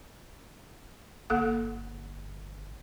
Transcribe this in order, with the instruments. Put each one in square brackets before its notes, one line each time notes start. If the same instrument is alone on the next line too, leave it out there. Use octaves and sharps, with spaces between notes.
[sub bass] G1 [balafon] A#3 A4 F#5